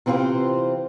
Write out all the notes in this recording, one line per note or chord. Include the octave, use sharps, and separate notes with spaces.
C3 E3 C4 F4 C5